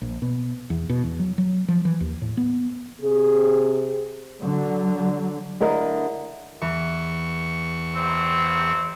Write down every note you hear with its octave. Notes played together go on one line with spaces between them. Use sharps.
A#1
B2
E2
B2
E2
F#3
F#3
F3
E3
D#2
A2
B3
C3 G#4
D3 F#3
D3 E4 A#4 D#5
E2 E3 C#6
G#1 C4